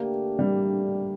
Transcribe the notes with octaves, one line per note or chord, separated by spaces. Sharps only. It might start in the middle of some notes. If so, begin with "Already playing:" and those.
Already playing: D3 A3 A#3 D4 G4
G3